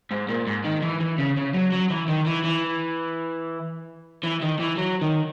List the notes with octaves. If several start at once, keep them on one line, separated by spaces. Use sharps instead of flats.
G#2
A#2
G#2
D#3
E3
E3
C#3
C#3
F#3
F#3
E3
D#3
E3
E3
E3
D#3
E3
F#3
D#3